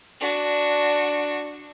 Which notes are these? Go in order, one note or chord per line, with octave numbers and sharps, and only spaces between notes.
D4 F#4